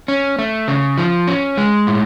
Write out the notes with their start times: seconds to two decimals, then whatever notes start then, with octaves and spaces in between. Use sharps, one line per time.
0.08 C#4
0.39 A3
0.68 C#3
0.98 F3
1.27 C#4
1.57 G#3
1.87 A2